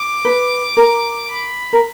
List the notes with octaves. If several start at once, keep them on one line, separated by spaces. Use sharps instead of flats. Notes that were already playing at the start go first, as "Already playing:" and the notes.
Already playing: D6
B4
A#4
B5
A#4